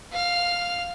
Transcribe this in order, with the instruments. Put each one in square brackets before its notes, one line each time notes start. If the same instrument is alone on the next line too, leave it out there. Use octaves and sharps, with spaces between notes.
[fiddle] F5 F6